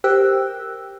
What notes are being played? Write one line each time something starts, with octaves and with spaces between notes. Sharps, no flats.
G4 A#4 C5 G5 E6 F#6